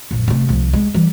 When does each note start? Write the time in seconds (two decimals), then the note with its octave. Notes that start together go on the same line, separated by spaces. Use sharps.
0.11 A#1 F#2
0.28 C3 A3
0.49 C2 F3
0.73 G#3
0.94 E3 G3